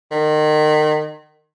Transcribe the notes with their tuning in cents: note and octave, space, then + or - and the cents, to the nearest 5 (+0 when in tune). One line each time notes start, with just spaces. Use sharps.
D#3 -30